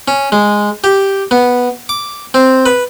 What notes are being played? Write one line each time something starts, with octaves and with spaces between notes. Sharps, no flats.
C#4
G#3
G4
B3
D6
C4
B4